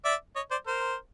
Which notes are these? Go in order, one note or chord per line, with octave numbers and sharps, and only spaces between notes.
D5 E5
C#5 D#5
C5 D5
A#4 C5